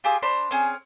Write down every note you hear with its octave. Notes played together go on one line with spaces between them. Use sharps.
F4 G4 G#4 E6
D4 C5 B5
C4 C#4 G#4